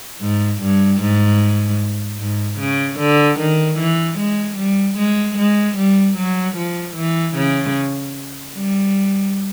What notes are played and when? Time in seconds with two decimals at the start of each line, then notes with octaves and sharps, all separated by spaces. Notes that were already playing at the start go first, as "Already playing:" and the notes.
0.21 G#2
0.62 G2
1.01 G#2
2.20 G#2
2.59 C#3
2.99 D3
3.39 D#3
3.78 E3
4.18 G#3
4.57 G3
4.97 G#3
5.38 G#3
5.77 G3
6.17 F#3
6.56 F3
6.96 E3
7.35 C#3
8.54 G3